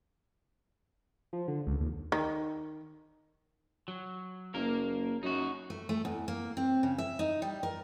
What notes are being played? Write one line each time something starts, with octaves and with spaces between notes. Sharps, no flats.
F3
D3
C#2
D#2
D#3
F#3
F#1 A#3 A#4
F#2 D#4 F#4
A3
A3
E2
A#3
C4
C#3
E5
D#4
G3
A#4